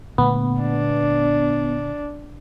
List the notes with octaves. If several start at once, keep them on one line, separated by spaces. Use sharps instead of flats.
A#2 D3 A3 B3
D4